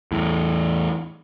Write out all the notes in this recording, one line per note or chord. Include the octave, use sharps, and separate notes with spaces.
E2 A2